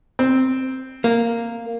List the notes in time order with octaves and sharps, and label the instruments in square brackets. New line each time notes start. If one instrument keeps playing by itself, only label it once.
[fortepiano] C4
[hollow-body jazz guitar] A#3